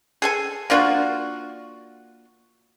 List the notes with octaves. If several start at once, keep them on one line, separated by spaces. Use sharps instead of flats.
G#4 A4 G#5
A#3 D4 F4 F#4